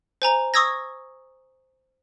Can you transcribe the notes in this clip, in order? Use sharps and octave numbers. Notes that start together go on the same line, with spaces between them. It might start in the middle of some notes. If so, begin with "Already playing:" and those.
C5 G#5 A#5 F7
C#6 D#6 E6 G#6 A#6